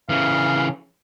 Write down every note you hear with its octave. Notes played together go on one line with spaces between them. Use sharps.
C#3 E3 F5